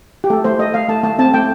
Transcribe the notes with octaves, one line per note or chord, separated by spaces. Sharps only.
G4
A3 A4
A3 C5
A3 D#5
A3 F5
A3 A5
A3 A5
C4 A5
A3 G5